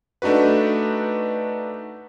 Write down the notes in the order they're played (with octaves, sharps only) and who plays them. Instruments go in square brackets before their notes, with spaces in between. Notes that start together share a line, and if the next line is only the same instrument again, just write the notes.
[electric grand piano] A3 D4 D#4 F#4 B4